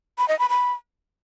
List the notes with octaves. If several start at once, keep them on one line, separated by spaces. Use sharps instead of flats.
B5
D#5
B5
B5